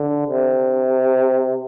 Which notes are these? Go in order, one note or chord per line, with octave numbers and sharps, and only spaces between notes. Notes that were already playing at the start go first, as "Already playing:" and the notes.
Already playing: D3
C3